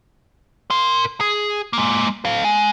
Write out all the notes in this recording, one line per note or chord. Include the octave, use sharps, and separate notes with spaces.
A#4 C6
G#4
G#3 A#3
A4 F5
G#3